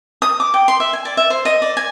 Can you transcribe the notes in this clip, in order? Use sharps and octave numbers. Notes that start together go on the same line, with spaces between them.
D#6
D6
G5
C6
E5
G#5
D5
E5
C5
D#5
D5
G#5